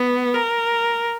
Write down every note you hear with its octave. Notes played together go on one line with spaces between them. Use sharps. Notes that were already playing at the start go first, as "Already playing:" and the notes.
Already playing: B3
A#4